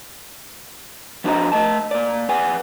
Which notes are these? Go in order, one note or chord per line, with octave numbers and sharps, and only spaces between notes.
F3 D4 F#4 C5 D#5 A#5
A3 D#5 A5
A#2 D5
F2 B4 F#5 G#5